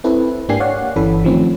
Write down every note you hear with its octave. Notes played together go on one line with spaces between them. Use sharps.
C4 E4 A4 B4
G#2 A#3 D4 G4 G#5 C7
C#5 D5 F5 F#5
G1 E3 C#4 A4 B5
D#3 F3 A3 C4 C#4